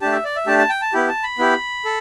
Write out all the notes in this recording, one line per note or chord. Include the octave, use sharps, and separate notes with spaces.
A3 D4 G4 A5
E5
D5
E5
A3 D4 G4 A5
A5
G5
A5
B3 E4 G4
A5
B5
B3 E4 G4
A4